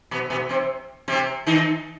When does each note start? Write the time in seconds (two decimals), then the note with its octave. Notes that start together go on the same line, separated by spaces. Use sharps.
0.11 B2 B3
0.30 B2 B3
0.49 C3 C4
1.08 C3 C4
1.47 D#3 D#4